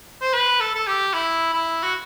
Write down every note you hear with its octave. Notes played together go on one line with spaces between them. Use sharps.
C5
B4
A4
A4
G4
E4
E4
F#4